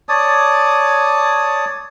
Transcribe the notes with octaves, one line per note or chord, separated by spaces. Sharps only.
C#5 D5 A5 D#6